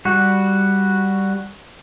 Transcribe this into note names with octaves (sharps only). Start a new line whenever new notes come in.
G3 F#4